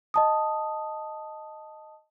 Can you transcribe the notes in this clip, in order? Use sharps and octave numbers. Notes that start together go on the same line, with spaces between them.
D#5 A5 D#6